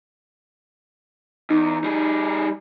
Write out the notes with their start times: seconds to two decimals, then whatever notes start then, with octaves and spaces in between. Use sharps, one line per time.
1.50 E2 D#4
1.84 G3 G#4